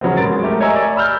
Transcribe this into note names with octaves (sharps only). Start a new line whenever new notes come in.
C#3 F#3 B3 C4
G#2 A#4 A6 D7
A3 G4 A#4
C#5 D#5 E5 G#5 A#5 E6
D5
B5 E6 F6 G6